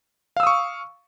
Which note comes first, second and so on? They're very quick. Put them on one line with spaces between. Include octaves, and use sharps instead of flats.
F5 E6 D#6 C#6